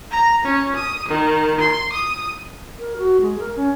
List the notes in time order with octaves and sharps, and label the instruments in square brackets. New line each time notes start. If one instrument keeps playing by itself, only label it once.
[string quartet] A#5
C#4
D#6
D#3
C6
D#6
[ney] A#4
F#4
G#3
A#4
C#4